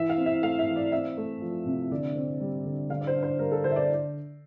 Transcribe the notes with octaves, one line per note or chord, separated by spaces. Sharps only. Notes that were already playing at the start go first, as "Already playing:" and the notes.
Already playing: E3 E5
F5
C4
E5
A3 F5
E5
E3
D5
C4 E5
A3
F3
C3
D3 D5
C4
G3
D3
D3 F5
D5
C5
D4
C5
G3 A#4
A4
D3 C5
E5
D5